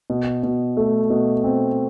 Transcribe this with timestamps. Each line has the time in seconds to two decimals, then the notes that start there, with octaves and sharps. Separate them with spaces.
0.10 B2
0.43 B2
0.77 A3
1.10 B2
1.44 C4